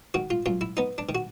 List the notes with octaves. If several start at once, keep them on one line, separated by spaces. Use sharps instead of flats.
D#3 F#4
F4
F#2 F4
E4
B3 D#4
D4
D#3
F#4